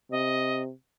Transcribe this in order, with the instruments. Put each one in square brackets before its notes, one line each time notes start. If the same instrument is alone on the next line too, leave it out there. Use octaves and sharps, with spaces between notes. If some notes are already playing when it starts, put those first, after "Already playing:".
[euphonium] C3 [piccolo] D#5